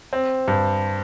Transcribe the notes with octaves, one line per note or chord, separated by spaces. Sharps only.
C4
G2